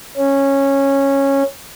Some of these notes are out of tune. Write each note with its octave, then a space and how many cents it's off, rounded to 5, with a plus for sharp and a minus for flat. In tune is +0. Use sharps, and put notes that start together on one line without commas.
C#4 -10